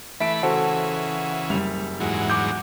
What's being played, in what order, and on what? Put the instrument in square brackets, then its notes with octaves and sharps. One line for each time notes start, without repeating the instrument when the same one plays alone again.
[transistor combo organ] E3 A3 B5 [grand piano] E5 D7
[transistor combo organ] C#3 E3 [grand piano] F#4 A4 C5
[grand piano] F#1 G3 F7
[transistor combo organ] E2 G#2 F#3
[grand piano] D6 G6